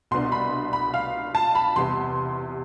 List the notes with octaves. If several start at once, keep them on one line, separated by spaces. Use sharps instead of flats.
C2 B2 B3 D4 C6
B5
B5
F5
A5
B5
E2 C3 G3 B3 C6